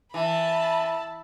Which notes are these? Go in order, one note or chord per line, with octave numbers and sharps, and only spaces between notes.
E3 A5 B5